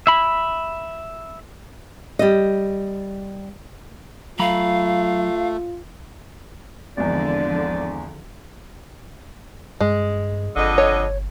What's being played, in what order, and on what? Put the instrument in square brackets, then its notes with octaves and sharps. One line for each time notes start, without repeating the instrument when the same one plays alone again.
[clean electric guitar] E5 B5
[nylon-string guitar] G3 D#5
[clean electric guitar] F#3 A#5 B5 [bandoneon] A3 [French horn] F4 [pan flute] F5
[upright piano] G#1 E2 [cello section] D3 F3 [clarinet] D5
[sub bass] G2 [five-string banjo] G#3
[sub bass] G1 [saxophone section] F2 D3 D#5
[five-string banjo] C#5